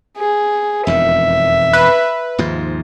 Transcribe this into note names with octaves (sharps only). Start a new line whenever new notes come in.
G#4
E1 F2 D#3 E5
B4
D#2 G#2 F3